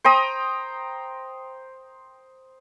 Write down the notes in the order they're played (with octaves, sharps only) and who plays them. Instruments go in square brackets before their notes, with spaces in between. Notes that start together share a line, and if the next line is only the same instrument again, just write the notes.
[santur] C5 G5 A#5 D#6